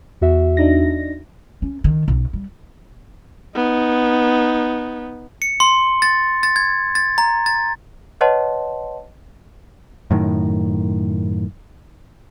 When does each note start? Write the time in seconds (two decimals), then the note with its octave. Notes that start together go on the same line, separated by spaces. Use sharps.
0.21 E2 F#4 E5
0.57 D4 D#4 A#6
1.62 C#4
1.84 D#3
2.08 B1
2.33 G3
3.55 B3 D#4
5.42 C#7
5.60 C6
6.02 A6
6.43 A6
6.56 G#6
6.95 A6
7.18 A#5
7.46 A6
8.21 B4 C#5 D#5 F#5 A5 C6
10.11 F#2 A2 D#3